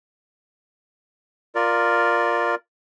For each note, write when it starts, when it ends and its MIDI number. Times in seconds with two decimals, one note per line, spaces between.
1.55 2.55 65
1.55 2.55 70
1.55 2.55 74